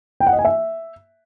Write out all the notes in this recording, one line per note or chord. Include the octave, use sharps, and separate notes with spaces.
G5
F#5
D#5
G#5
E5